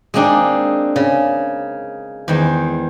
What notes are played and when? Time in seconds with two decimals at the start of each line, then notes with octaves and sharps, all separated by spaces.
0.14 G#3 A#3 C4 D4 D#4
0.96 C#3
2.28 E2 D#3 G#3 C5